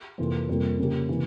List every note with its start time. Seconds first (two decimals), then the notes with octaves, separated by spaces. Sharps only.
0.18 F2 C3 E3 A#3 F4
0.49 F2 C3 G3 A#3
0.79 C#3 F3 A#3 C#4 G4
1.09 C3 E3 A#3